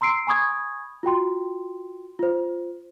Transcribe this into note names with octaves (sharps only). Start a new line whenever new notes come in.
A#5 C6 E6 C7 D7
G#5 B5 C#6 D#6 G#6
F4 F#4 G5 C6
F4 C5